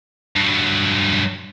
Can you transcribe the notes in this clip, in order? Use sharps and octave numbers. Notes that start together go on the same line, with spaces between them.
G2 F#3